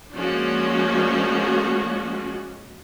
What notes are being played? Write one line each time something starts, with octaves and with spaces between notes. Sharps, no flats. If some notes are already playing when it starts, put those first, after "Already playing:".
F3 G#3 A#3 C#4 D4 F#4